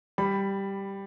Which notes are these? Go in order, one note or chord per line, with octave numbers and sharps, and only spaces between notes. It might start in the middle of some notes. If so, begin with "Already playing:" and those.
G3 B5